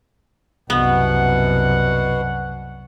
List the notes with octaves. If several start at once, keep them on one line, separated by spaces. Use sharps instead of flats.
C2 F#2 B2 B3 F#5